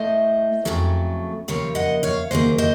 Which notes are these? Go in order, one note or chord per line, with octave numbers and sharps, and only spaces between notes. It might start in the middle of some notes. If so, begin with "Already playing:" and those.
Already playing: A2 A3 C5 D#5
F2 C#3 F#3 A3
D#2 C#3 F3 A#3 C#5 F5
D#5 F#5
C#5 F5
D#2 C#3 F#3 A#3 C5 D#5
C5 D#5